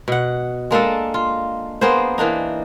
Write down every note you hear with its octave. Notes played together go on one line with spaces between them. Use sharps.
B2 F#5
G#3 A#3 D4 A4
F4
A#3 B3 G#4 C5
E3 A#3 D4 D#4